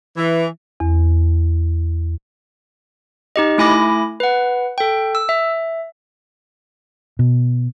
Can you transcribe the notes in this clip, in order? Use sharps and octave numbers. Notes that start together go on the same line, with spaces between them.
E3
E2
D#4 G4 D#5
A3 E4 G#5 B5 D6 A#6
B4 F#5
A4 G5
E6
E5
B2